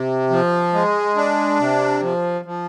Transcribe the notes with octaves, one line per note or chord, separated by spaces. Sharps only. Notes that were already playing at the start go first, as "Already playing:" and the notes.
Already playing: C3
F3
G#3
D4
C3
F3
F3